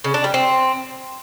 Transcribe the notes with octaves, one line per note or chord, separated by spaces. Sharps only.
C#3
D4
G3
C4